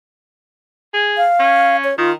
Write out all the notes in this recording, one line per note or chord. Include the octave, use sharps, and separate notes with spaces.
G#4
F5
C#4
C#5
D#3 F4